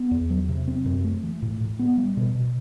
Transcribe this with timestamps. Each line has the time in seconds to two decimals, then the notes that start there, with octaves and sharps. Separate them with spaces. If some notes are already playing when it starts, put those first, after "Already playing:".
Already playing: B3
0.11 E2
0.30 F#3
0.49 C3
0.68 C4
0.86 F#2
1.04 A3
1.23 E3
1.42 A2
1.61 A2
1.79 B3
1.97 G3
2.17 B2
2.35 B2